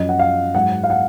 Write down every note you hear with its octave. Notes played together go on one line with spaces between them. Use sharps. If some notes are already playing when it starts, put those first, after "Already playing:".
Already playing: F#2 F3 D#5
F#5
F5
G#2 F#3 F#5
F5
F#5